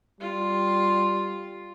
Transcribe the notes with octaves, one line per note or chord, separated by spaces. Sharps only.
G3 F4